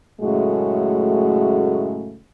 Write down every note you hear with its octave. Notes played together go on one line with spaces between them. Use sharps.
F#2 A2 C#3 G#3 A3 F#4